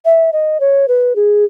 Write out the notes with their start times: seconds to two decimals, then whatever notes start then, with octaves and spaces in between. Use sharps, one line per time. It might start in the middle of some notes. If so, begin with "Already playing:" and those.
0.05 E5
0.32 D#5
0.60 C#5
0.88 B4
1.16 G#4